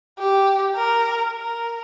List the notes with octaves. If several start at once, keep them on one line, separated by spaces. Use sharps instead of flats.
G4
A#4
A#4